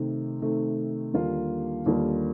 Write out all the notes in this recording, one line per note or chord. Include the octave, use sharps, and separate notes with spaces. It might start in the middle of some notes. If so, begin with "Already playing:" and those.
Already playing: C3 D#3 A3
C3 D#3 A3
D#2 D3 G3 A#3 F4
D#2 D3 G3 A#3 F4